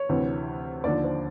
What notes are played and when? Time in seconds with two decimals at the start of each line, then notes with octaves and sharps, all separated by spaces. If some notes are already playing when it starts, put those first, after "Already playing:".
Already playing: C#5
0.09 D2 C3 E3
0.84 D#2 D3 F3 D5
1.04 C5